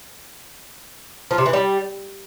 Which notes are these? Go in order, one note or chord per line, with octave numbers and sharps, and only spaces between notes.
F3
C3
E3
G3